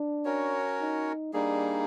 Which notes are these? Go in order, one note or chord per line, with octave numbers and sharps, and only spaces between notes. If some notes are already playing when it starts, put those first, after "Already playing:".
Already playing: D4
C#4 F#4 A#4 C#5
D#4
G3 A#3 D4 D#4 G#4